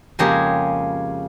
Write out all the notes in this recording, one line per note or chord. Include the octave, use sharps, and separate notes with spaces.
F2 C#3 G#3 A#3 G4 G#4